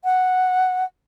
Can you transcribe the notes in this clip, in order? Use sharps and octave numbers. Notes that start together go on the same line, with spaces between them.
F#5